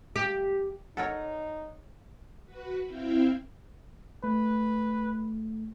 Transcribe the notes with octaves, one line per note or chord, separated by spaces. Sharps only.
G4
D#4 A4 A#4 C#5 F#5
F#4 B4
C4 E4 E5 F5 G5
A3 B4